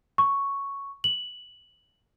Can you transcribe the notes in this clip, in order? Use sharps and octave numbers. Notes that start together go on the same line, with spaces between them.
C#6
F#7